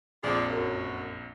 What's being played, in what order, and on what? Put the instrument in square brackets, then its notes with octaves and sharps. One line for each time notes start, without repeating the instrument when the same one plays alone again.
[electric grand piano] A#1 F2 [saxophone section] F4 G#4 D5
[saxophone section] F#2